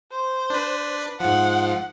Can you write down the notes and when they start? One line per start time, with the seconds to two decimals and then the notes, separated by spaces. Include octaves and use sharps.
0.12 C5
0.50 D4 B4
1.20 G#2 F3 F#5